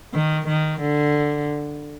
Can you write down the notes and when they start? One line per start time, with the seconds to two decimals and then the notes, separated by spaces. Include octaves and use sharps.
0.13 D#3
0.48 D#3
0.81 D3